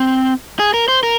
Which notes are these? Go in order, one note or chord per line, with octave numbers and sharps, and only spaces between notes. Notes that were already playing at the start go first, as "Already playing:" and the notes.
Already playing: C4
G#4
A#4
C5
A#4